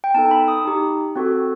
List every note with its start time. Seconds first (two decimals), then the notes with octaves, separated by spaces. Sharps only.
0.04 G5
0.14 B3 D#4 A4 A5
0.31 B5
0.48 D#6
0.65 D#4 G4
1.16 C4 F#4 A4